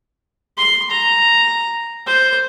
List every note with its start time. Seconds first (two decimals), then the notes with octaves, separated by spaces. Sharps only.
0.58 C6
0.91 A#5
2.07 C5